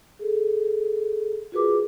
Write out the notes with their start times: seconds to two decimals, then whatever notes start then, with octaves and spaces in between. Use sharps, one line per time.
0.19 G#4 A4
1.52 F4 F#4 G#4 A#4 B4 D6